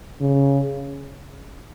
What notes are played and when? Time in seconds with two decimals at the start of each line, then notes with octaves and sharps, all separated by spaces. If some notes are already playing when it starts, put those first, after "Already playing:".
0.21 C#3